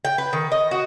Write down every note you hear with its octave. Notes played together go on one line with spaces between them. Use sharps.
G5
B4
D#3
D#5
F#4